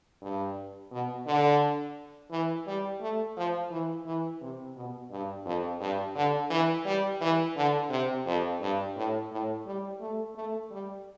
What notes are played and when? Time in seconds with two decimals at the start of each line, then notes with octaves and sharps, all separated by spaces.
0.22 G2
0.91 B2
1.27 D3
2.31 E3
2.67 G3
3.01 A3
3.37 F3
3.71 E3
4.06 E3
4.41 C3
4.76 B2
5.11 G2
5.45 F2
5.81 G2
6.15 D3
6.50 E3
6.85 G3
7.21 E3
7.56 D3
7.90 C3
8.26 F2
8.61 G2
8.96 A2
9.31 A2
9.66 G3
10.01 A3
10.35 A3
10.71 G3